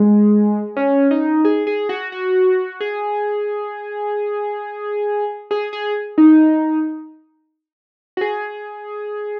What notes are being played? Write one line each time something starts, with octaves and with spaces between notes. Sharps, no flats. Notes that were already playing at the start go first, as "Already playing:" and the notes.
Already playing: G#3
C#4
D#4
G#4
G#4
F#4
F#4
G#4
G#4
G#4
D#4
F#4
G#4